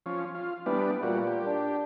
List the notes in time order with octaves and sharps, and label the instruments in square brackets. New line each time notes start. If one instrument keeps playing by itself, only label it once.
[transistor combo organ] F3 C#4
F4
[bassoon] E3 [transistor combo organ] G3 B3 D4
[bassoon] A#2 [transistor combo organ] G3 F#4
[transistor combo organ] G4
[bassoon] D4